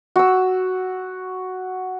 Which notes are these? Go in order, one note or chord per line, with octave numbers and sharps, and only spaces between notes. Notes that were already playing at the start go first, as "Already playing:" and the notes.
F#4 E6